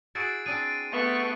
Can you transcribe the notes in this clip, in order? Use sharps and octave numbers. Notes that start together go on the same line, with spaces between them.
E4 F#4 G#4 A6 C7 D7
C4 D4 G#4 D#7
A3 B3 C#6